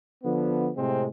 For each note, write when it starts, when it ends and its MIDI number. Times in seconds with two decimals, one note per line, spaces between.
0.23 0.70 50
0.23 0.70 53
0.23 0.70 59
0.77 1.06 45
0.77 1.06 48
0.77 1.06 56
0.77 1.06 60